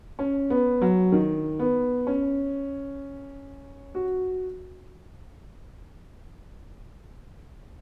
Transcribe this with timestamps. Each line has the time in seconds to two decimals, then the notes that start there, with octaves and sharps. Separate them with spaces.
0.19 C#4
0.50 B3
0.82 F#3
1.12 D#3
1.59 B3
2.07 C#4
3.95 F#4